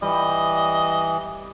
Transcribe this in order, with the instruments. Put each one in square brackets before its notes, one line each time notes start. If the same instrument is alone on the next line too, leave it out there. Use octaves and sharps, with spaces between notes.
[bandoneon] E3 [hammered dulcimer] G3 [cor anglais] D#5